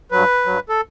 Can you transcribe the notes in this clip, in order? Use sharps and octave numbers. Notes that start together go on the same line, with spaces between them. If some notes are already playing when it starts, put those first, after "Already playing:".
G2 F#3 B4
G2 F#3
A4